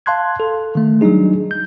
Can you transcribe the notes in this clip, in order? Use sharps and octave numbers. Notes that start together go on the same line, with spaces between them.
F5 A5 C6 F#6 G#6
A4
D#3 A3
F#3 G3 D4 D#4 G#4
G6